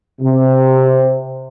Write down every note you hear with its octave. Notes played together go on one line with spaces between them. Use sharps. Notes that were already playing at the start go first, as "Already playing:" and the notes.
C3